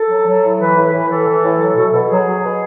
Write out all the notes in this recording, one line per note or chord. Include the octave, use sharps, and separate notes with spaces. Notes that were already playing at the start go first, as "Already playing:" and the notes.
Already playing: A4
F#3
F#3
A2
E3 B4
A2
B4
A2
E3 A4
E3
A2
F#3
B2
B2
F#3 G#4
F#3
B2